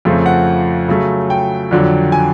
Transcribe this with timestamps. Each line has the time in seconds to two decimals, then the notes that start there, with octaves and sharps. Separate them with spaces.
0.05 F2 C#3 F3 A3 C4
0.26 F#5
0.88 C#3 F#3 A3
1.30 G5
1.71 F2 D3 F#3
2.12 G#5